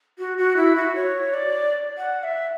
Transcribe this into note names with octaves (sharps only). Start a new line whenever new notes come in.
F#4
F#4
E4
F#4
C#5
D5
F#5
E5